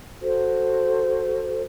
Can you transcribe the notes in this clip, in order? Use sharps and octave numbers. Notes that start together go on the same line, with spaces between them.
F#4 A4 C5